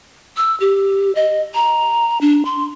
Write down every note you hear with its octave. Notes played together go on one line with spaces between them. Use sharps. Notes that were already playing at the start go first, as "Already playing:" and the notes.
E6
G4
D#5
A#5
D4
C6